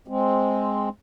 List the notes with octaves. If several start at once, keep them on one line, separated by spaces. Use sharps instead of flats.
G#3 C4